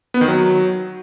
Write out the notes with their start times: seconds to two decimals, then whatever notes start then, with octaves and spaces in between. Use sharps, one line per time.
0.14 B3
0.21 D#3
0.28 F#3